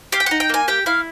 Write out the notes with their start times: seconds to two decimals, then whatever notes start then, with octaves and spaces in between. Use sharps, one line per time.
0.12 G4 F5
0.20 G5
0.26 D#4 F#5
0.40 G5
0.49 A#3 G#5
0.68 G4 G5
0.86 E4 F5